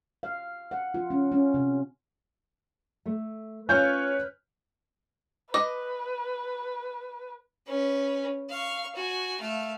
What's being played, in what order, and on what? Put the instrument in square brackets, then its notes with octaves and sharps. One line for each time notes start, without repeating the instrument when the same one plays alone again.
[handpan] F5
F#5
F4
C#4
C#4
C3
[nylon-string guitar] A3
[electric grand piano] C#4 C#5 F6 [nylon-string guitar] F4 [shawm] B4 [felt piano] G#5 G6
[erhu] B4 [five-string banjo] D#5 [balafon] D6
[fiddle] C#4 B4
F5 C#6
F#4 G#5
A3 F5